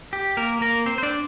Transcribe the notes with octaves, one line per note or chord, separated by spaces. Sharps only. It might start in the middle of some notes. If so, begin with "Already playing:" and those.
G4
A#3 A#4
A#3 A#4
C4 C5
C5
D4 D5